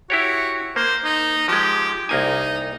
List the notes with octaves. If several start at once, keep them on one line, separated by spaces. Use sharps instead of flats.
E4 F#4 G4 C#5
A#3 C5
D#4
F3 G#3 G4
C2 A#3 D#4 G#5